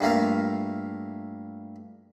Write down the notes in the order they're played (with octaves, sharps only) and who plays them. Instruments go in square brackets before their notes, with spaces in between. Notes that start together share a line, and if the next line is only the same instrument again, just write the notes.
[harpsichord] G2 A3 A#3 F4